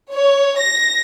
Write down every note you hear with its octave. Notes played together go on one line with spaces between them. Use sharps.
C#5
A#6